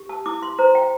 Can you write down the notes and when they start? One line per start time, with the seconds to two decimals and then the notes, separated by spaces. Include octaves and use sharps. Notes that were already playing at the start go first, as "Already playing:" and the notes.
Already playing: G4
0.09 A5
0.26 E4 D6
0.42 C6
0.59 C5 A#5
0.75 G5